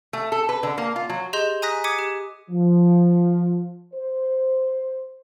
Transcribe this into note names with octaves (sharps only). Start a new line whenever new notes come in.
A3
A4
B4
D3
A#3
F4
F#3
G4 G#4 D#5 C6 G6 F7
G#5 A#5 D#6 F#6 A#6 B6
D6 D#6 G#6 B6 C#7 D#7
G4
F3
C5